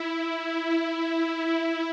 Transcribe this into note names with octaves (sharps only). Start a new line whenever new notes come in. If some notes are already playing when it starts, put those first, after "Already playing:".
Already playing: E4